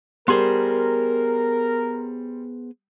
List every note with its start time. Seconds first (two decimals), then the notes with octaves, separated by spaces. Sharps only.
0.28 G3 B3 G#4 A#4 C5 C6